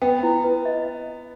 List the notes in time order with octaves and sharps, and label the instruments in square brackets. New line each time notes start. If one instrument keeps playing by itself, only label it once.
[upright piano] B3 [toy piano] G5
[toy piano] E4
B4
D#5